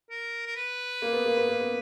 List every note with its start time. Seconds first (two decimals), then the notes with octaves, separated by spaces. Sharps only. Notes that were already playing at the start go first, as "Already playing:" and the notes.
0.10 A#4
0.46 A#4
0.56 B4
1.02 A#3
1.13 B3
1.25 A#3
1.37 B3
1.49 A#3
1.61 B3